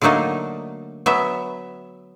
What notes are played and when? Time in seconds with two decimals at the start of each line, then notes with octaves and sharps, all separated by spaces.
0.01 D3 F#3 A3 A#3 D#4
1.06 F#3 B3 E5